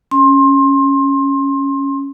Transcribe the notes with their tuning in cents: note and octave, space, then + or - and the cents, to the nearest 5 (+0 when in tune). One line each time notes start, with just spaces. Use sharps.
C#4 +0 C6 +25